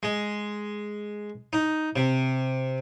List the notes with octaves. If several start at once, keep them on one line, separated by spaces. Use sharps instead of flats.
G#3
D#4
C3